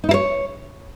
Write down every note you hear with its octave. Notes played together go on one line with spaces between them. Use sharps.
D#4
E4
C#5